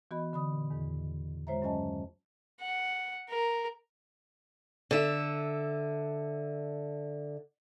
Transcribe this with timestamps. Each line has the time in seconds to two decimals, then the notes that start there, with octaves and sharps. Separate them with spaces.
0.11 E3 B3 F#4 D#5 B5
0.33 D3 B5 D#6
0.52 A#2
0.70 E2 G#2 D#3
1.47 G#3 F4 C5 C#5 E5 A#5
1.61 G2 F#3 C#4 D#5 G#5 A5
2.61 F#5
3.29 A#4
4.91 D3 E5